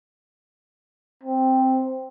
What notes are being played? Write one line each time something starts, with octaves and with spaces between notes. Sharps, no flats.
C4